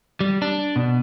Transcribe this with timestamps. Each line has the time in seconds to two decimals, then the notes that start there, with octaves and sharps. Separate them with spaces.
0.20 G3
0.42 D4
0.76 B2